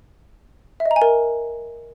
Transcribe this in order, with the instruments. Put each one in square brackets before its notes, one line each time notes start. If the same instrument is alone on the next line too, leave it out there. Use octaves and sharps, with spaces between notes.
[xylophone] E5
D#5
A#5
G#5
A#4